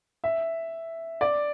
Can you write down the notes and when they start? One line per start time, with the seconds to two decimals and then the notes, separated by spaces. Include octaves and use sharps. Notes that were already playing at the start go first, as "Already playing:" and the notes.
0.24 E5
1.21 D5